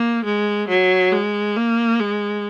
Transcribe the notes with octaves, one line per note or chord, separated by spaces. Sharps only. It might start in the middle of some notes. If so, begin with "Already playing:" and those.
Already playing: A#3
G#3
F#3
G#3
A#3
G#3